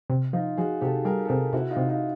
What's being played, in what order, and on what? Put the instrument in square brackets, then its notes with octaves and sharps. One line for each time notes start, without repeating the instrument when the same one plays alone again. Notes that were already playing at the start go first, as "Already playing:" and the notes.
[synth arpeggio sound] C3
[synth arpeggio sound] F3 [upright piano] D#4 F4
[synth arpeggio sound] F3 [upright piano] F#4 G#4
[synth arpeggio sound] C3 [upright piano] G4 A4
[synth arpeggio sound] G3 [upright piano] G#4 A#4
[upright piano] A4
[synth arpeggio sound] C3 [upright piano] G#4 A#4
[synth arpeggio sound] C3 [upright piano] E4 F#4
[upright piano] D#4 F4
[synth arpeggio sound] C3
[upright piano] D#4 F4